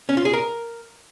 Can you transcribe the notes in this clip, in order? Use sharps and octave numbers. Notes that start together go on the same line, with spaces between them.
C#4
F4
G#4
A#4